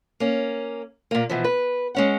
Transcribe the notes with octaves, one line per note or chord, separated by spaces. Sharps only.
A#3 C#4
A#2 A#3
B2 E3 F3
B4
G#3 C#4 F#5